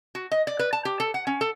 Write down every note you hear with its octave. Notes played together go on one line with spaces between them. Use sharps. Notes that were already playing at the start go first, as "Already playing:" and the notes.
F#4
D#5
D5
B4
A5
G4
A4
F#5
C#4
A4